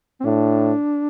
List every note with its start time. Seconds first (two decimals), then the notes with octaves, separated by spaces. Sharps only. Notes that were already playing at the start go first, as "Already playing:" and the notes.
0.20 C4
0.25 A2 D4